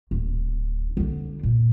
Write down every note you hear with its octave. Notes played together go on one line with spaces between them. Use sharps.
D1
D3 D4
A#2